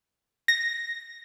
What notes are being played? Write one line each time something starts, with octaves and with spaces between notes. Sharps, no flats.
A#6